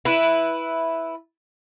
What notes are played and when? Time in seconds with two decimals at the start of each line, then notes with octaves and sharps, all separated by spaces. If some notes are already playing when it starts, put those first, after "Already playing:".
0.05 E4 B4